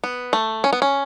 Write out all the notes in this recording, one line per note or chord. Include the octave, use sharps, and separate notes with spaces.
B3
A3
C#4
B3
C#4